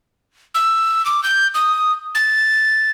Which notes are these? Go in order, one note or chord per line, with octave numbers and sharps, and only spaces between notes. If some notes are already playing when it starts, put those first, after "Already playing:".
E6
D6
G6
D#6
A6